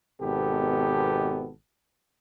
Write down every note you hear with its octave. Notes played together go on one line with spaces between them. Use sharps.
G#1 B2 B3 G4 A4